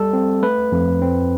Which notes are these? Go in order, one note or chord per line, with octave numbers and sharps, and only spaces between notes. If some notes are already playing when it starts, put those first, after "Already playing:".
Already playing: G3 A4
C4
A3 B4
F2
C4